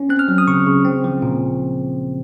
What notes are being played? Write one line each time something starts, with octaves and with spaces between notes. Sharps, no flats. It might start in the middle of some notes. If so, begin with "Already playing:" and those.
Already playing: C#4
C4 F#6
F6
F#3
D#6
C#3 C#6
C#3
C4
F3
A#2